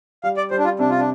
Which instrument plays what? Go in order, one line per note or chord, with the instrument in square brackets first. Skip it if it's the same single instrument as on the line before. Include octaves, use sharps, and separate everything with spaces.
[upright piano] G3 [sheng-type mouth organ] F5
[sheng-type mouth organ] D5
[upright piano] G3 [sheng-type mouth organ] C5
[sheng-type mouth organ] D4
F4
[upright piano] C3 [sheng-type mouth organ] D4
[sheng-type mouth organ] F4
D4